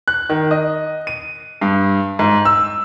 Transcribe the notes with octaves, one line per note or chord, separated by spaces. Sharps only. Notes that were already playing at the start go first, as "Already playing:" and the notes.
F#6
D#3
D#5
D#7
G2
G#2
E6